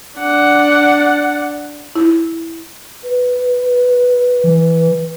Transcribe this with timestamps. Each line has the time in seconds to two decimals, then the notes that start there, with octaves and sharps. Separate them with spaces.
0.17 D4 F#5
1.96 E4
3.04 B4
4.44 E3